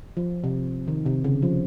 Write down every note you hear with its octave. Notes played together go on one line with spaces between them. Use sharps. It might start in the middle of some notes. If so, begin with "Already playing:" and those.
F3
C3
D#3
C3
C#3
F3